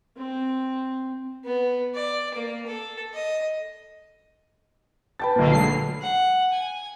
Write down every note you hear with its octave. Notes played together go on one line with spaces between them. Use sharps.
C4
B3
D5
A#3
A4
D#5
B4 G5 A5 A6
B1 A#2 D3 A#3
F#3 G#3 A3 C7
F#5
G#5